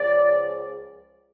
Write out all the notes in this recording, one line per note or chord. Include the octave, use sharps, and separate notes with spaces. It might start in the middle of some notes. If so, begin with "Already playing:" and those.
Already playing: C#2 C#3 F3 D5